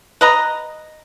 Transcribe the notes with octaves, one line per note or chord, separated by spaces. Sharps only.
B4 D#5 A#5